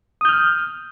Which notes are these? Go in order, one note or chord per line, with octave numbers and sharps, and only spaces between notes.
D#6 F6 G6